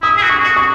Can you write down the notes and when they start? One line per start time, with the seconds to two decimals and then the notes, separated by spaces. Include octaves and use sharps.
0.02 E4 D#6
0.17 G#4
0.23 F#4
0.29 C#6
0.43 F#4
0.56 C#6